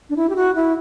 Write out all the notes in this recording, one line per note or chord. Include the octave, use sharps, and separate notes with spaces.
D4
E4
G4
F#4
E4